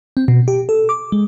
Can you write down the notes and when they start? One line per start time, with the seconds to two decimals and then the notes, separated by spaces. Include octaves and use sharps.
0.17 C4
0.28 B2
0.48 G4
0.69 A4
0.89 D6
1.12 G#3